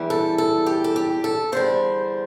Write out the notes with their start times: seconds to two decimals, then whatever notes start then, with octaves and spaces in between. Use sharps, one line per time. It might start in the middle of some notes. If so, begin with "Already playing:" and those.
Already playing: E2 E3 G3
0.10 A4
0.38 A4
0.66 G4
0.84 A4
0.96 G4
1.24 A4
1.52 E2 D3 G3 C5